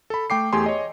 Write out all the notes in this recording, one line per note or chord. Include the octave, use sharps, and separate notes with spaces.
A4 B5
A3 G5 D6 C7
E2 A3 G4 G#4 G#5 C6
C#5 D#5